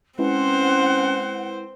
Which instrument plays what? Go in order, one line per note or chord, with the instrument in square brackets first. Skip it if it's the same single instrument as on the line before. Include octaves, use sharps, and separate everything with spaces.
[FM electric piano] G#3 E4 B4 [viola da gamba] C4 C5 [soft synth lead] C#4 [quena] F#5